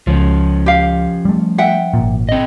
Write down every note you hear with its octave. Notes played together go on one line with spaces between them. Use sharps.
C#2 F3 C#4
G4 F5
G3 A3
E5 F#5 G5
G#1 A#2
C4 D#5